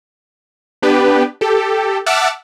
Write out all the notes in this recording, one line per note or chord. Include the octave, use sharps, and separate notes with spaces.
B3 D4 G4 B4
G4 A4
E5 F#5 A5 D6 E6 F6